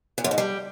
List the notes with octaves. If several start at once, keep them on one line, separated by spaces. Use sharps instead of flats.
A#2
F#2
G#2
G3